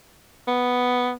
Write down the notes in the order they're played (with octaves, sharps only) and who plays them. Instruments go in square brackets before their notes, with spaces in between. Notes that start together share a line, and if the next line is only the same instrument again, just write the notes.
[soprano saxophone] B3